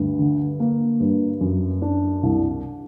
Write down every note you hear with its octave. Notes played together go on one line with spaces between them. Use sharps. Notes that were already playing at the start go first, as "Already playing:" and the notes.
Already playing: D2 G2
D3
A#3
G2
F#2
D4
C2